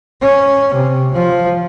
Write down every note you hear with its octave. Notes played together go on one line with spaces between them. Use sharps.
C#4
C3
F3